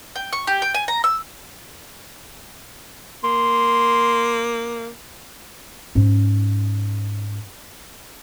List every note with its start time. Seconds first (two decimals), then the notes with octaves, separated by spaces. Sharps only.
0.16 G5
0.33 C#6
0.47 G4
0.62 G5
0.74 G#5
0.88 A#5
1.04 E6
3.24 A#3 C6
5.95 G#2 C#4